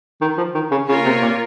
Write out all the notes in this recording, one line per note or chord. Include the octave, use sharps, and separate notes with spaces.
D#3
F3
D#3
C#3
C#3 A#3 F4 A#4 C#5
C3
A#2